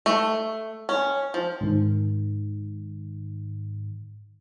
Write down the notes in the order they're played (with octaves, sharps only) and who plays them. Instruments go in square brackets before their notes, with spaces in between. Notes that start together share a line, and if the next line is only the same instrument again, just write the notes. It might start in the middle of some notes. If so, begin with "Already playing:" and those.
[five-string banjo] A3
C#4
F3
[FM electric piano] G#2 D#3